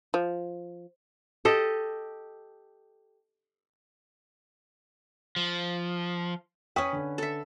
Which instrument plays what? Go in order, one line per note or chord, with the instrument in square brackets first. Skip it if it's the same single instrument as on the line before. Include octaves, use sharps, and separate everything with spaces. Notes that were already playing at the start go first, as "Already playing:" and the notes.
[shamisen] F3
[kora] G4 A4 D#5
[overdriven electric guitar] F3
[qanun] C#4 B4 [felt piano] G5 C#6 D#6
[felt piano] D3
[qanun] A4 E5